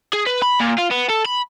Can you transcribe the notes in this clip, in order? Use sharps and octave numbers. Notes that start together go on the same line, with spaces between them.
G#4
B4
B5
A#2
F4
B3
A4
B5